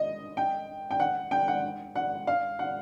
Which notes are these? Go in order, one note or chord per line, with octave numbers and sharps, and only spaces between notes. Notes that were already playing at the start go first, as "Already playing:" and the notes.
Already playing: D#5
G5
G5
F#5
G5
F#5
F#5
F5
F#5